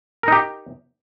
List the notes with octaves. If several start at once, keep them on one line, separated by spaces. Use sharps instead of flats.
D#4 G4 A#4